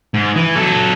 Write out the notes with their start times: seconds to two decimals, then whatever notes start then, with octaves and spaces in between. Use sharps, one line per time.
0.14 G#2
0.36 E3
0.56 F#3 A4